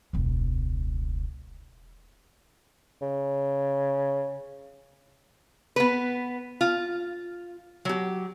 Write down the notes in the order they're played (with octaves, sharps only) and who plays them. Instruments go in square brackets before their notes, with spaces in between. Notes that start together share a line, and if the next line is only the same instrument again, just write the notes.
[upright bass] E1 C#2
[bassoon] C#3
[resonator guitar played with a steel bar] B3 B4
F4
F#3 G4